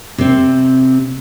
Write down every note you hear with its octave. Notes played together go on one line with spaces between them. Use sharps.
C3 C4